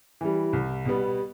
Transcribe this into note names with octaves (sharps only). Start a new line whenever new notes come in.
E3 G3
C2
B2 G3 B3